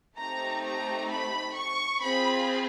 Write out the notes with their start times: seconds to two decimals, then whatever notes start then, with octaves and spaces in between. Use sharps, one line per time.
0.17 A3 C4 D#4 G4 A#5
0.64 A#5
1.10 B5
1.55 C#6
2.02 C4 F4 G#4 B5